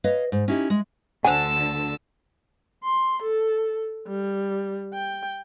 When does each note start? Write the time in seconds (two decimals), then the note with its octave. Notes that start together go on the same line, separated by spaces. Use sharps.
0.04 B4 C#5 D#5 F5
0.32 G#2
0.48 C#4 D#4 E4 G4
0.70 G#3
1.25 D2 D3 C5 F#5 G#5 A5 E6
2.84 C6
3.23 A4
4.08 G3
4.94 G5